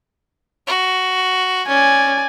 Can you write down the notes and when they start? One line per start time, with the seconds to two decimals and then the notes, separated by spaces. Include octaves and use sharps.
0.67 F#4
1.68 C#4 D5 G#5